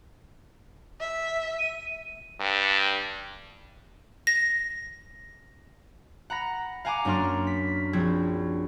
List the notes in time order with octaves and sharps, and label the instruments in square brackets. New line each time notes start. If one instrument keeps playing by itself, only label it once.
[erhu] E5
[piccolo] D#7
[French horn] G2
[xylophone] A#6
[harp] F#5 A#5 B5 A#6
F5 F#5 G#5 A#5 D6
F#2 A#3 D4 A#5 C6 F6
B6
A#1 C4 G#6